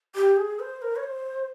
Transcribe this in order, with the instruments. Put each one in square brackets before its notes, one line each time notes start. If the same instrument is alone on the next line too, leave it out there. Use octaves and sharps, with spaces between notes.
[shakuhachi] G4
G#4
C5
A#4
C#5
C5